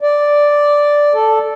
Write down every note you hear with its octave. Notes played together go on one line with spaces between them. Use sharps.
D5
A4